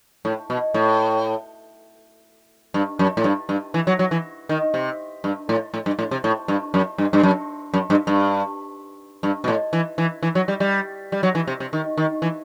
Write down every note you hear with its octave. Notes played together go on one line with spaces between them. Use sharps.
A2
B2
A2
G2
F#2
A2
G2
G2
E3
F#3
F#3
E3
D#3
C3
G2
A2
A2
G2
A2
C3
A2
G2
F#2
G2
G2
F#2
F#2
G2
G2
G2
B2
A2
E3
E3
E3
F#3
G3
G3
G3
F#3
E3
C3
C3
D#3
D#3
E3